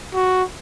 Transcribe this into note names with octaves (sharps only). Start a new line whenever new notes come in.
F#4